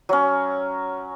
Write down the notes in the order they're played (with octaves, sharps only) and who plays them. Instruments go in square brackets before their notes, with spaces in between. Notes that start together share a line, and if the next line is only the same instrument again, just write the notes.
[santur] F#3 C#4